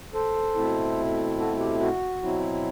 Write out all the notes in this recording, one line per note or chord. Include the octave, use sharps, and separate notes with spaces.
A4 C5
B2 A3 C4 E4
F#4 A4
G4
F#4
B2 F#3 C4 E4